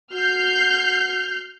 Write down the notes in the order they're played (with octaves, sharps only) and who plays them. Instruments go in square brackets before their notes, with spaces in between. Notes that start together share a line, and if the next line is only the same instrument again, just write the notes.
[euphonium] F#4 [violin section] F6 G6 C7